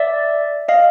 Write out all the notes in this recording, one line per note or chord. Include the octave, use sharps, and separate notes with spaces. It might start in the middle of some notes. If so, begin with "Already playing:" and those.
Already playing: D5 E5
D#5 F5